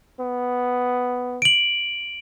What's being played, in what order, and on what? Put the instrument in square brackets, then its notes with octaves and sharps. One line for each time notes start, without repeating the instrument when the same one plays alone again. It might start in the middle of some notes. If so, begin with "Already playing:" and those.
[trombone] B3
[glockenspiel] D7 F#7